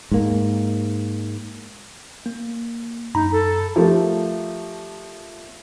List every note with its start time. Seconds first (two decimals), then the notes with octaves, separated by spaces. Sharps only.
0.11 G#2 A#3
2.26 A#3
3.15 F#2 D#4 A#5 B5
3.32 A4
3.76 F3 A3 G4 A4 A#4